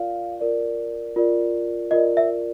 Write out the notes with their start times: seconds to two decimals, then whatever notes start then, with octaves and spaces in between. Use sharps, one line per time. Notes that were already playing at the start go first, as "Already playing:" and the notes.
Already playing: F4 A#4 D5 F5
0.40 F4 A#4 D5
1.16 F4 A#4 D5
1.91 F4 A#4 D5 D#5
2.17 E5